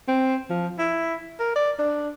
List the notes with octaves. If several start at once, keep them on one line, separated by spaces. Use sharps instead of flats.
C4
F3
E4
A#4
D5
D4